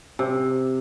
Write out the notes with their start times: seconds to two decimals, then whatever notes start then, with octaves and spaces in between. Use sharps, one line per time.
0.19 C3